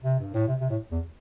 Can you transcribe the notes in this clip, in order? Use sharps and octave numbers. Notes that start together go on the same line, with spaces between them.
C3
G2
A2
C3
C3
A2
E2